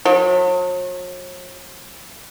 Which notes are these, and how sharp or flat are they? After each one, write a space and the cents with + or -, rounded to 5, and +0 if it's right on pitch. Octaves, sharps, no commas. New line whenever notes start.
F#3 -45